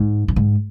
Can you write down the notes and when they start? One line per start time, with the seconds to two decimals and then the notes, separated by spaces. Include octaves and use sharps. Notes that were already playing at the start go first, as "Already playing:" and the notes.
Already playing: G#2
0.28 F#2
0.36 G#2